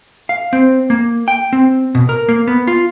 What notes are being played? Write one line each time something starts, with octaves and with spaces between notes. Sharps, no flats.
F5
C4
A#3
G5
C4
B2
A#4
A#3
B3
F4